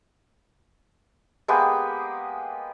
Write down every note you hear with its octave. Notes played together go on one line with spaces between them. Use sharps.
G#3 A#3 B3 G4